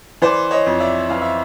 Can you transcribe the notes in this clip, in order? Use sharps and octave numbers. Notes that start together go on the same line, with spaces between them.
E3 C5 D5
C#5 D#5
F2
D5 E5
E3 F5
E5